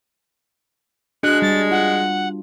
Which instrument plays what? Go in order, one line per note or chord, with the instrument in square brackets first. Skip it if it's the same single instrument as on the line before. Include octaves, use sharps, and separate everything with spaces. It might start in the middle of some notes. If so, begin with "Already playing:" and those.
[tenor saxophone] G#3 [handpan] D4 F#4 [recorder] F#6
[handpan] G3 [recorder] A6
[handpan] F4 [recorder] F#5